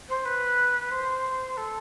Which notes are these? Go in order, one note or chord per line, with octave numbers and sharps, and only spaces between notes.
C5
B4
C5
A4